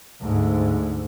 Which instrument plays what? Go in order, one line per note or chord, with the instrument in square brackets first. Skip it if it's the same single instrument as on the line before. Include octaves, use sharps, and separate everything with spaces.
[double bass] D2 G#2